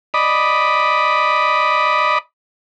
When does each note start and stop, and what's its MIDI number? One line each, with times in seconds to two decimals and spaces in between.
0.14 2.18 74
0.14 2.18 75
0.14 2.18 83